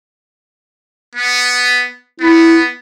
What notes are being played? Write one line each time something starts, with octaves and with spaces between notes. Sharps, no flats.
B3
B3 E4